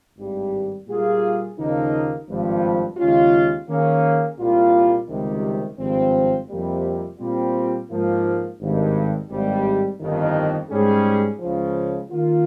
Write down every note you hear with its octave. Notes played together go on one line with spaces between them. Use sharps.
G#1 G2 G3
A#2 G3 A#3 F4 G#4
D#2 C#3 F3 A#3 D#4
G#1 G2 F3
D#2 C#3 G#3 C#4 F4
D#3 A#3 C#4 G#4
C2 A#2 G3 A#3 F4
C#2 C3 D#3 G3
G#1 G2 F3 C4
F2 C3 G3 A#3
A#2 G3 C4 F4
G#2 F3 A#3 F4
G#1 G2 D#3
G#1 G2 G3
G1 F2 D#3
G#2 G3 C#4 G#4
C#2 C#3 F3
D#3 A#3 F4